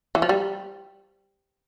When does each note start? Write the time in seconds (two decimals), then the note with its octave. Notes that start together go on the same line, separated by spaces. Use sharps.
0.15 E3
0.22 F3
0.29 G3